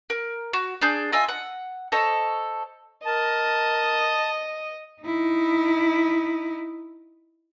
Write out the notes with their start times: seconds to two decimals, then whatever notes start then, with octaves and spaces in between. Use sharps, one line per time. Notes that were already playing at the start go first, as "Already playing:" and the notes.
0.10 A#4
0.53 F#4
0.82 D4 G#4 G6
1.12 F4 D#5 E5 G#5
1.29 F#5
1.92 A4 C5 C#5 D#5
3.05 A#4 D#5 A5
5.02 D#4 E4